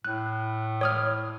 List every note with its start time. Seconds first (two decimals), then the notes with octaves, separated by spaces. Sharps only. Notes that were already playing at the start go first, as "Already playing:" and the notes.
0.05 A2 F#6
0.81 C#5 D#6 F6